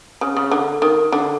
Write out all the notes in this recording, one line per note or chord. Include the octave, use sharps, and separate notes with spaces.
C#3
C#3
D3
D#3
D3